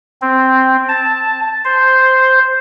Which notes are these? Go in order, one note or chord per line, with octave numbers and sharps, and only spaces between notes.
C4
A5
C5